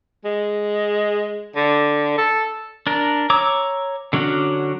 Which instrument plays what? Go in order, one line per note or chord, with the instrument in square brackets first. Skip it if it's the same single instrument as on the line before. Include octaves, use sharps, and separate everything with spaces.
[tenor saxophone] G#3
D3
A4
[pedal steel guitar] D4 A#4
C#5 A#5 D6 E6
D3 F#3 C#4 D4 F#4